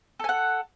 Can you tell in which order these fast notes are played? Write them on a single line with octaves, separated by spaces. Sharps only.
A4 G#5 F#5